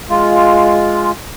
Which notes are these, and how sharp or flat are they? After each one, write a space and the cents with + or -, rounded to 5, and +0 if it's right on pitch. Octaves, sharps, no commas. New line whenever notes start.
G#3 +0 F4 +0